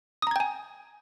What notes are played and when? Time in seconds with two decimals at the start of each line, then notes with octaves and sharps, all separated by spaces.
0.22 D#6
0.27 A#5
0.31 G#6
0.36 G5
0.40 G#5